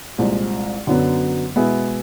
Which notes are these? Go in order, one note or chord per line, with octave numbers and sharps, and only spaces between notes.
C2 A#2 F3 G#3
F#2 D3 F#3 B3
B2 G#3 B3 E4 G#4